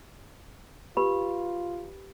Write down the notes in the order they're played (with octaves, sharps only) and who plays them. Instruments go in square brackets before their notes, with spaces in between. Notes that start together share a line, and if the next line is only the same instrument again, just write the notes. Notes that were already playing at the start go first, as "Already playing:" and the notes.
[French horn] F4 [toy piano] G4 B4 B5